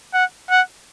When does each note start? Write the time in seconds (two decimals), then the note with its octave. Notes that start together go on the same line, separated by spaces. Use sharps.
0.14 F#5
0.50 F#5